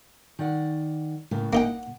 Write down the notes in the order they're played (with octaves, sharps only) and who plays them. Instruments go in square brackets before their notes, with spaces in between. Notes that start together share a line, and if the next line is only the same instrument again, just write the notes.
[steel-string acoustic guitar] D#3 D5 F#5
A2 C#3 A#3
[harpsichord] A#3 D#4 G5 [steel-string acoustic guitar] F#5